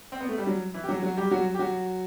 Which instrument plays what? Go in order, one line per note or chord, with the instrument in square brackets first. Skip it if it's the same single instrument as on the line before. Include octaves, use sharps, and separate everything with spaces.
[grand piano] C4
B3
A3
G3
F#3
E3 E4
G4
F#3 F#4
F#3 F#4
G3 G4
F#3 F#4
G4
F#3 F#4